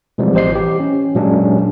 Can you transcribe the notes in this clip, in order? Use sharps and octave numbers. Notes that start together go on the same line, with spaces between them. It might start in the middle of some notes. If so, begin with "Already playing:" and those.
B2 E3 F3 G3 G#3 C4
A1 G4 C5 D#5 C7
E3 G4
C#4
A#2 F#3 G#3 C#4 D4 G4